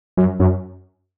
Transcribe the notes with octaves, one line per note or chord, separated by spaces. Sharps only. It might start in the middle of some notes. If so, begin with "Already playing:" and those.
F#2
F#2